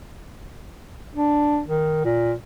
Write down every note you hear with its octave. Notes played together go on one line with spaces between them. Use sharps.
D4
D#3
A#2